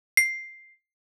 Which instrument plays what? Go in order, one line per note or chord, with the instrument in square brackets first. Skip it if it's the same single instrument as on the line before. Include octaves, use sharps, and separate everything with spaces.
[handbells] C7